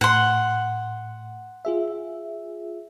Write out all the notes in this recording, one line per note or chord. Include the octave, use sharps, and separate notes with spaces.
A2 F#5 C6
F4 G#4 E5